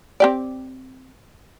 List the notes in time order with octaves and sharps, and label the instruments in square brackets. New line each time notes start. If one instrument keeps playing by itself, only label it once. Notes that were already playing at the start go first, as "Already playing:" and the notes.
[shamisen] C4 G4 D5